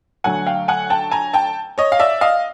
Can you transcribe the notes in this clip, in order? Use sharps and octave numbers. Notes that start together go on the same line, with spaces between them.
D3 F#3 A3 F#5 G#5
F5 G5
F#5 G#5
G5 A5
G#5 A#5
G5 A5
C#5 D#5
F5
D5 E5
D#5 F5